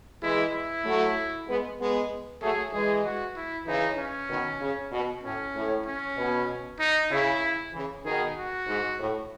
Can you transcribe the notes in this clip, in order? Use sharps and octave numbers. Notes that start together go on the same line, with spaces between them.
E3 G#3 E4
E4
F#3 A3
G#3 B3
G#3 B3
F#3 A3 G#4
E3 G#3 G#4
F#4
E4
C#3 E3 D#4
C#4
B2 D#3
C#3
B2
A2 C#4
A2
C#4
B2
D#4
C#3 E4
C#3 E3
B2 D#3 G#4
F#4
G#2
A2